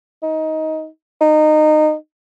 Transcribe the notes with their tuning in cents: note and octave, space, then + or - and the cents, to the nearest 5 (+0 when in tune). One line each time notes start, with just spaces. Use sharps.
D#4 +15
D#4 -20